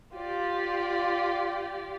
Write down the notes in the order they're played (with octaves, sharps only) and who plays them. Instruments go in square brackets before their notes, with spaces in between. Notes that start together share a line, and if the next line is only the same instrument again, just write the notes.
[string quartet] F4 G4 D5